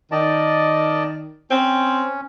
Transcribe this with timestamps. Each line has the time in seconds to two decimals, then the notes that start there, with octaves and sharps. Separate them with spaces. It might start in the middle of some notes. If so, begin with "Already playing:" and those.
0.12 D#3 D5 D#5 A5
1.51 C4 C#4